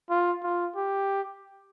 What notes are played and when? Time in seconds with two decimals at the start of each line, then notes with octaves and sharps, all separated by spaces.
0.10 F4
0.43 F4
0.76 G4